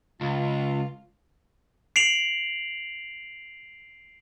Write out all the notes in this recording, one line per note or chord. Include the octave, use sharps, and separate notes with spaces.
C#2 F4
C7 D7 F7 F#7